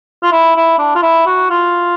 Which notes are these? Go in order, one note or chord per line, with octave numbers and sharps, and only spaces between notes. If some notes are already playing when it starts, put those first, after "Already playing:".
F4
E4
E4
D4
F4
E4
F#4
F4